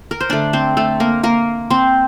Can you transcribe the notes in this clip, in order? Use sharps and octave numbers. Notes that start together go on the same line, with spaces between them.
A#4
C5
D3 A3 D4 D5
C4 C5
A3 A4
A#3 A#4
A#3 A#4
C4 C5